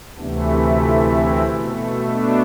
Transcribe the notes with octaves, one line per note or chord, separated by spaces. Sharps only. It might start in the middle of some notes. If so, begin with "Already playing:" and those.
D2 C3 E3 A3 B3 D4
C4 E4
D4 F4
C4 E4
B2 A3
B3 D4